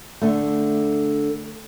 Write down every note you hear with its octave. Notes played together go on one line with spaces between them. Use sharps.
D3 A3